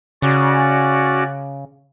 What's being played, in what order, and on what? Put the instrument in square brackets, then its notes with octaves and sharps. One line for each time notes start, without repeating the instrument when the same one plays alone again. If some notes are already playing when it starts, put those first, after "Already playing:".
[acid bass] C#3 [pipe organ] C#4 F#4 D5